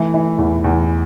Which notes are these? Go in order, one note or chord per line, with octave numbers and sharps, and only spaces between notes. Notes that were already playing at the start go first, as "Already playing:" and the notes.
Already playing: E3 A3
E3
E2
E2